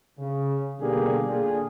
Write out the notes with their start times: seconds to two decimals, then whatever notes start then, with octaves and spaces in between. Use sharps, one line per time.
0.19 C#3
0.81 B2 D3 G3 A#3 G4 G#4
1.28 A#2 D3 D4 F4 G#4